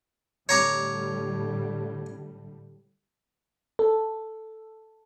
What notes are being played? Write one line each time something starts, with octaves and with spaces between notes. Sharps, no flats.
A2 D3 G3 C#5 A#5 D6
A4